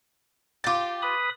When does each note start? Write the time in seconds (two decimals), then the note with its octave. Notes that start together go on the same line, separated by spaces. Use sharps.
0.64 F4 G4 D6 A6
1.02 B4 B5 D#6